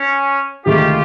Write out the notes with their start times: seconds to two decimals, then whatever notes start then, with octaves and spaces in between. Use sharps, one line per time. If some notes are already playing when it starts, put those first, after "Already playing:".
Already playing: C#4
0.66 D2 C3 D#3 G#3 F4 G4